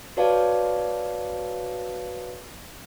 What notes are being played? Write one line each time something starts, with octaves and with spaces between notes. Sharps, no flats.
F#4 B4 C#5 D5 F5 A5